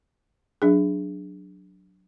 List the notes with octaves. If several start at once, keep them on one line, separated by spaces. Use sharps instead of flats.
F#3 D4 G#4